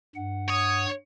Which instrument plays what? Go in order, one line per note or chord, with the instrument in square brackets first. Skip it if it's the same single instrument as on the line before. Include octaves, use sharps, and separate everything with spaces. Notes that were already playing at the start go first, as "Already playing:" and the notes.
[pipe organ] G2 F#5
[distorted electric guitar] C#5 [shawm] D#6